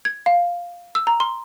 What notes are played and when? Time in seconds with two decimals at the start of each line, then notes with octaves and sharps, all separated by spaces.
0.05 G#6
0.26 F5
0.95 E6
1.07 A#5
1.20 C6